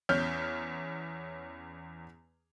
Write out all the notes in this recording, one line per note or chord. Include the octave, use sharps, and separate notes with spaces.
E2 C#4 F6 G6